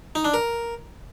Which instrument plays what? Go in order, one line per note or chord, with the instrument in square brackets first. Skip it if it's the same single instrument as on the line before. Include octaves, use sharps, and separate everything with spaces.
[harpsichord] D#4
D4
A#4